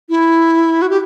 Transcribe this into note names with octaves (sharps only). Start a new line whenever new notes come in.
E4
F#4
G4